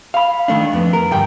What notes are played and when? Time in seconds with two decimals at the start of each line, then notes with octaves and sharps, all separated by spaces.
0.14 F5 B5
0.48 D#3 A3 D4
0.73 F2 B3
0.93 A#4
1.11 D2 G2 G5